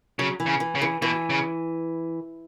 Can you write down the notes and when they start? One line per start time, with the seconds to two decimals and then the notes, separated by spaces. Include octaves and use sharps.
0.19 C#3 F#3
0.40 E3
0.46 C#3
0.60 E3
0.75 C#3
0.82 E3
1.02 B2 E3
1.30 C#3